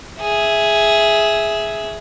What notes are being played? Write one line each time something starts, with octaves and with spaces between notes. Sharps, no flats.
G#4 E5